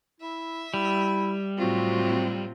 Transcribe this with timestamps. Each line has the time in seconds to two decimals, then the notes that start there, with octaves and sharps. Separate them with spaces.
0.20 E4 E5
0.74 G3 E4
1.58 A2 C3 F#3 C4 F4 F#4